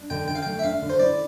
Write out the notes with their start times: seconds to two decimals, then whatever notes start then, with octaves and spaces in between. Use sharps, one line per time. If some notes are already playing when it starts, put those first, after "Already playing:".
Already playing: D4
0.10 D3 G5
0.28 D3 G5
0.35 F5
0.43 A3 G5
0.59 E5
0.63 D4 F5
0.82 D3
0.90 C5
0.99 E4 D5